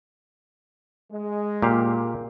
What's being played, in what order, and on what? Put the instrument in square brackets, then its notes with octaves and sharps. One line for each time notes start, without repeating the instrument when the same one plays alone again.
[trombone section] G#3
[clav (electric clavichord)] A#2 G4 F5